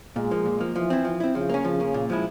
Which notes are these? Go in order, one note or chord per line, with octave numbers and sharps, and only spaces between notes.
A#2 G#3
F3 A#3
A#2
F3 A#3
E3 F3
C4 E4
F3
C4 E4
C#3 F3
A#3 C#4
C#3 F3
A#3 C#4
A#2
F3 G#3 E4